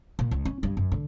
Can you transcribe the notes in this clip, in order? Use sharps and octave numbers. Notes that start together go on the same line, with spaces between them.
A#2
C#2
C#4
G2
F#2
D3